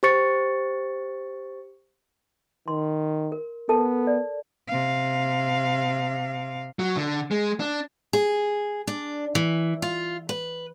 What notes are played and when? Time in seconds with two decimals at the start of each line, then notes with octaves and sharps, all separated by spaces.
0.03 G4 C5 C#6 A6 C#7
2.68 D#3 C6
3.32 A#4
3.69 B3 A4 A#4 A5
4.07 D5
4.68 C3 F5
6.79 F#3
6.97 D3
7.31 G#3
7.60 D4
8.13 G#4
8.87 D4
9.35 E3
9.82 F4
10.29 B4